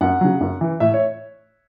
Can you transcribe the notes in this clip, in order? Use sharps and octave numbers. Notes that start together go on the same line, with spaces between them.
F#2 F#5
C#3 F#3
F#2
E3
A2 E5
C#5